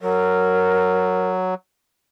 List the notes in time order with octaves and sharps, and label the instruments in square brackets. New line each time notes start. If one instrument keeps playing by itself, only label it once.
[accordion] F#3 [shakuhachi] A#4